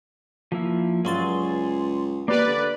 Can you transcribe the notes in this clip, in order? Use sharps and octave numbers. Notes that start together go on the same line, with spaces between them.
F3 A#3 E4
C#2 G2 F#3 G#4 C6 A6
A#3 G4 B4 D5
D3 B5